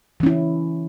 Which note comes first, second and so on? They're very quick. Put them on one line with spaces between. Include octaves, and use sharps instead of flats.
E3 C#4 E4